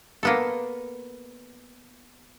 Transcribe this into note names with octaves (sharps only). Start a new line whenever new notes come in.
A#3 B3 A4